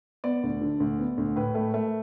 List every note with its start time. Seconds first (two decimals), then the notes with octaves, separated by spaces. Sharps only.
0.24 B3 D5
0.43 D2
0.61 D3
0.80 D2
0.99 B3
1.18 D2
1.36 A2 B4
1.55 A3
1.74 A3